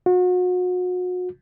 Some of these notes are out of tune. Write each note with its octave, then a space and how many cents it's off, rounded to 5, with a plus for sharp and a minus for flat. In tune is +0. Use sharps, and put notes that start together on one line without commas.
F#4 -35